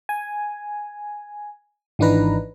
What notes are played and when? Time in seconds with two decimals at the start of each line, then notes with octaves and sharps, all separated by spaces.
0.09 G#5
1.99 G#1 E3 D4 D#4 B4 A#5